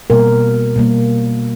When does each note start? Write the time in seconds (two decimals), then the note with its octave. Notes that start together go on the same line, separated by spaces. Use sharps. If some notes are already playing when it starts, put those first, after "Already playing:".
0.10 B2 G3 A#3 A#4
0.76 B2 G3 A#3